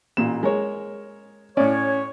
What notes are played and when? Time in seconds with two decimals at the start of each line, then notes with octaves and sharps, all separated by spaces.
0.17 A1 A#2 E7
0.43 G#3 A#4 C#5
1.57 A2 C#4 C#5 D5